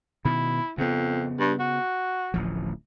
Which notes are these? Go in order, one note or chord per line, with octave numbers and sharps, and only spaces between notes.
B2 D#3 E4
F2 C#3 B3
G2
F#4
D1 A1 F3